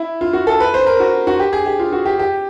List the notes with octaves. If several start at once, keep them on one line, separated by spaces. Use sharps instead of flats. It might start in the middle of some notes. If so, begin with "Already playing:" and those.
Already playing: E4
F4
F#4
A4
B4
C5
A#4
F#4
F#4
G4
G#4
G4
F4
F#4
G4
G4